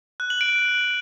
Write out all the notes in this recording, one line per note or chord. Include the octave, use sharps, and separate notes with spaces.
F#6
F#7
D7